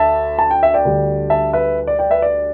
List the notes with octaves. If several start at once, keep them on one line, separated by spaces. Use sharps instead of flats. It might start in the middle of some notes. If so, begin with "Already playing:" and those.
Already playing: D2 D3 D4 E5 A5
A5
G5
E5
D5 G5
D2 D3 G3
E5 A5
B4 E5
D5
D5 G5
B4 E5
D5